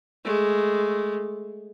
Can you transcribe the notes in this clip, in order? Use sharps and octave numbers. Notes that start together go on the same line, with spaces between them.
G#3 A3